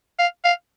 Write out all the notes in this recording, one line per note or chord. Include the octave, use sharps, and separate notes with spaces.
F5
F5